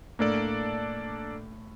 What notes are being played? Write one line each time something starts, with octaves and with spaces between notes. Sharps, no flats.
A2 A#3 D4 A4 D5